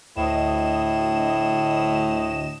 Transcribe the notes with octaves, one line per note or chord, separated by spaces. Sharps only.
D2 A2 D#5 E7